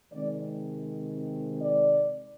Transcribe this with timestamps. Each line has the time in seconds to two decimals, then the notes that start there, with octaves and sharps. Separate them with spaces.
0.11 C3 D#3 G#3 C4 D5
1.60 D5